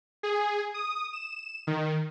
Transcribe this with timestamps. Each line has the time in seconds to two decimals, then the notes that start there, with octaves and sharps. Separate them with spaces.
0.23 G#4
0.74 D#6
1.13 E7
1.67 D#3